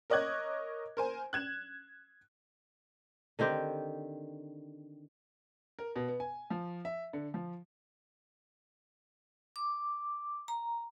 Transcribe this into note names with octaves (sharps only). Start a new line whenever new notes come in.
A#4 C#5 D#5 D6 F#6 G#6
A#4 C5 G#5
F#6 G#6 E7
D3 D#3 C4 G4
A#4
B2
B3
G#5
F3
E5
D3
F3
D6
A#5